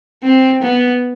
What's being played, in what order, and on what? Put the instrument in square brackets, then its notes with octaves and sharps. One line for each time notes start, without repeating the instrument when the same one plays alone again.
[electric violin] C4
B3